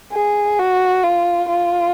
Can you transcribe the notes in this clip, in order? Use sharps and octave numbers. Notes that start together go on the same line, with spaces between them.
G#4
F#4
F4
F4